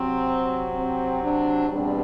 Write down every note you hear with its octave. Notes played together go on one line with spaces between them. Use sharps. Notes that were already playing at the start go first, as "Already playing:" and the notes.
Already playing: C3 F#3 C4
C4
D4
E2 B2 G3 C4 D4